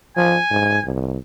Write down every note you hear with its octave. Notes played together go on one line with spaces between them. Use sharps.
F3 G#5
G#2
C2